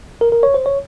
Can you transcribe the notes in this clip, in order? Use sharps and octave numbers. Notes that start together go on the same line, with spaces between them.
A#4
A#4
C#5
C5
C#5